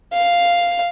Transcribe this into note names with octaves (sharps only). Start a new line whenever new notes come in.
F5